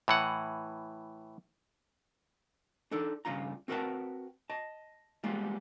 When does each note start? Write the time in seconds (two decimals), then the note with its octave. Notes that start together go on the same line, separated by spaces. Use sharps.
0.08 A2 E3 F#5
2.91 D4 D#4 A4 D5
3.25 G2 C#3 F4 A#5
3.68 C4 F#4 A#4 B4 F#5 A5
4.50 D#5 A5
5.24 G3 G#3 A#3 B3 F4